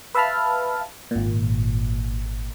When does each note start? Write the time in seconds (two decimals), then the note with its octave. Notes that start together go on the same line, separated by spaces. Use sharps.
0.15 B4 E5 F5 A5 B5 F6
1.11 G#1 A#2